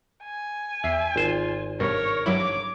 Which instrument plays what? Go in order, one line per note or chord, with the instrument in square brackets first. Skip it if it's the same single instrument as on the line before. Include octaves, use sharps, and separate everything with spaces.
[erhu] G#5
[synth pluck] E2 C7 [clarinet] E5
[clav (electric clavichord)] G#1 C5 [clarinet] F4
[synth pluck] G2 B2 [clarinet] A#4 [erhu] C#5
[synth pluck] G2 F#3 E4 [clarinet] C#5 [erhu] D6